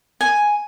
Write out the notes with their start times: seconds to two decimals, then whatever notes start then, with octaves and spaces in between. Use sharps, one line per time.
0.21 G#5